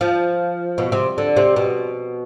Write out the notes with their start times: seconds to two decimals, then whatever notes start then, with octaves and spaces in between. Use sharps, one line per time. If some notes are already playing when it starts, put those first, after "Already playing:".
0.01 F3
0.78 B2
0.92 C3
1.18 D3
1.36 C3
1.56 B2